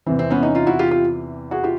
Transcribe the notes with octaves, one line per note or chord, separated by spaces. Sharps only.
E2 C3 E3 C4
C4
B3 C#4
C#4 D#4
D#4 F4
E4 F#4
F4 G4
F4 G4
F#4 G#4
F4 G4